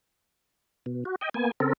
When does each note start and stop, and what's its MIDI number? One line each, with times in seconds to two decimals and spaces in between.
0.86 1.04 47
1.05 1.15 66
1.21 1.29 75
1.21 1.29 79
1.34 1.51 58
1.34 1.51 59
1.34 1.51 80
1.60 1.73 49
1.60 1.73 60
1.60 1.73 69
1.60 1.73 70